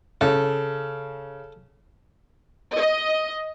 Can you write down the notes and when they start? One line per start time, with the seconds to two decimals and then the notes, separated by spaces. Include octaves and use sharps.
0.21 C#3 A4
2.75 D#5